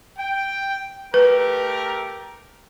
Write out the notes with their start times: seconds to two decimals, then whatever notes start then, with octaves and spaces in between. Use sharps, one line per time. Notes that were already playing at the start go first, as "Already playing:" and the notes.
0.18 G5
1.14 A3 G4 A#4 B4